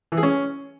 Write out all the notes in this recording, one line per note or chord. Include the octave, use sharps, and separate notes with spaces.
E3
G#4
C#4